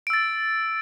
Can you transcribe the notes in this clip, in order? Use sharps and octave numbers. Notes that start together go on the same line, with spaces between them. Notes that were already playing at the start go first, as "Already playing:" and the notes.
E6 A6 D7